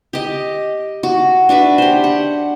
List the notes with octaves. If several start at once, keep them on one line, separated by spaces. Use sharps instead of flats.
G4 D#5
F#4
D4 F#4 B4 E5
G4 C5
F#5